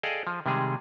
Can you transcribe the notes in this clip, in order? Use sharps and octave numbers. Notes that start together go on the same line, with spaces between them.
G#4 A4 D5 D#5 F5 G5
F3
C3 D#3 G3 G#3 G#4